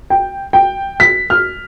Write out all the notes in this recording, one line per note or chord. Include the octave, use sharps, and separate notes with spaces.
G5
G5
B6
F6